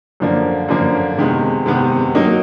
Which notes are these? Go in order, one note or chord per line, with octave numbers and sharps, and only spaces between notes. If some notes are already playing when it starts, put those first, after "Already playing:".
F#2 D3 F3 A#3 D4
F#2 D3 F3 A#3 D4
C3 D#3 G#3 B3
C3 D#3 G#3 B3
F#3 A#3 D#4